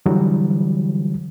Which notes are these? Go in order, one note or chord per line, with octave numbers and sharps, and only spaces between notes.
D3 E3 F#3 G3